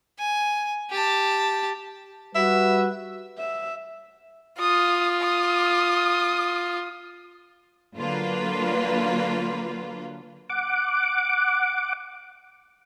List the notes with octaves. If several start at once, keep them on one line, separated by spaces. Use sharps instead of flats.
G#5
G4 A5
G3 F#4 B4 E5
E5
F4 D#6
D#6
D3 F#3 A#3 F4 B4
F#5 D6